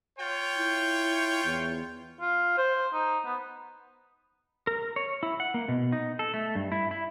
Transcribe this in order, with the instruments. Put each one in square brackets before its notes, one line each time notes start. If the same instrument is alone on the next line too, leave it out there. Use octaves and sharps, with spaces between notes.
[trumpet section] F4 C#5 G5
[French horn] E4
E2
[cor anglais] F4
C5
D#4
B3
[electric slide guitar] A#4
C#5
E4
F#5
A#3
B2
D#4
A4
A3
G2
E4
E4